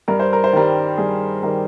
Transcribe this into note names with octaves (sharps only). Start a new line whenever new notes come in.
G2 A#4
C5
A#4
C5
D#3 G3 A#4
G2 G#4
D#3 G3 A#4